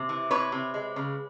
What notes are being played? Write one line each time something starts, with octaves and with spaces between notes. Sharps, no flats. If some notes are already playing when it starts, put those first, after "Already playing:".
Already playing: C3
E3
C3 B4 C#5
C3
G#3
C#3